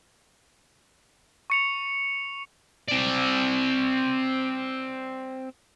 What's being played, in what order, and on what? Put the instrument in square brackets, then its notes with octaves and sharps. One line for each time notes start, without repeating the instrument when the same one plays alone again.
[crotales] C#6 C#7 F7
[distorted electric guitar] C4 D5